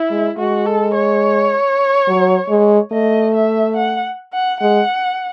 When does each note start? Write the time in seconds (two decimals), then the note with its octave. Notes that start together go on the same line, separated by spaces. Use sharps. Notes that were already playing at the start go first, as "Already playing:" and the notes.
Already playing: E4
0.11 G#3
0.38 G#3 F#4
0.66 A4
0.95 C#5
2.08 F#3
2.50 G#3
2.92 A3 D#5
3.34 E5
3.76 F#5
4.33 F#5
4.61 G#3 F#5